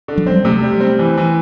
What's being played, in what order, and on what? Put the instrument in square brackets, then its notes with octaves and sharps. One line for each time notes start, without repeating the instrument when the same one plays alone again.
[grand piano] D3
[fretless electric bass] F#3
[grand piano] C4
[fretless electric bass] G3
[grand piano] C3 [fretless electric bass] F#3 A3
[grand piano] G3
C4
E3
E3